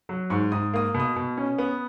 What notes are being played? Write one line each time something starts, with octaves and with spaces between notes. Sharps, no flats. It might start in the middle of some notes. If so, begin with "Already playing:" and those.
F#3
G#2 C#6
G#2 D#6
A#3 D#6
B2
D#6
B2
C#4
B3